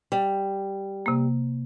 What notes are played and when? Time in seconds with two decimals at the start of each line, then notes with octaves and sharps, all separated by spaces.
0.12 G3
1.06 C3 A#3